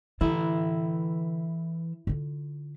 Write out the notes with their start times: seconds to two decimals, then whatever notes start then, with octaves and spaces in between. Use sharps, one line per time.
0.21 D3 E3 E4 A4 E5
2.07 D3 F4